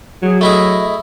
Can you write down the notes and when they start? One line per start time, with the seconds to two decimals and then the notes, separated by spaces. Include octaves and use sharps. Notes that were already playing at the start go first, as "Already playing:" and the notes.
0.22 F#3 G#4
0.41 A3 E4 G#4 D#5